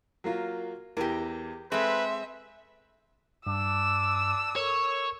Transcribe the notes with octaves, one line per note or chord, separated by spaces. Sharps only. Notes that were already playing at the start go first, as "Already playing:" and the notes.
F#3 A#3 F4
E2 E3 G4 A#4
G#3 C4 A4 B4 E5
G2 D4 D6 E6
A4 A#4 C#5